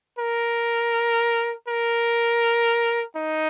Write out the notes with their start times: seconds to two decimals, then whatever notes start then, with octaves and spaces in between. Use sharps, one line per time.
0.19 A#4
1.69 A#4
3.17 D#4